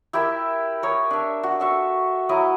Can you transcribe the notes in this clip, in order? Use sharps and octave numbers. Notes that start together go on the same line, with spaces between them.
E4 G4 A#4 E5
A#4 C#5 D#6
D4 E5
F#4
A4 E5 C#6
F#3 E4 A#5 D#6